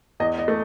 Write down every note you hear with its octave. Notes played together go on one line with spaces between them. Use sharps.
E2 D#5
D#5
A3